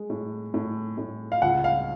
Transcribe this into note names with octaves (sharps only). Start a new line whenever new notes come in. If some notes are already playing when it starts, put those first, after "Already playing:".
Already playing: G#3
A2
A2
A2
F5
C#2 F#5
F5